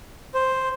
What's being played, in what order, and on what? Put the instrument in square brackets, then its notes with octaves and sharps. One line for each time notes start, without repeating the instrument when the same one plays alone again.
[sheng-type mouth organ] C5